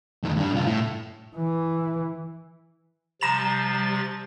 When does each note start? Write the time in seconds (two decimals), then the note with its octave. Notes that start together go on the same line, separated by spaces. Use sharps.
0.23 F2 D#3
0.36 G2 D4
0.52 C2 F4
0.66 A2
1.36 E3
3.21 C3 F3 G3 A#5 A6 E7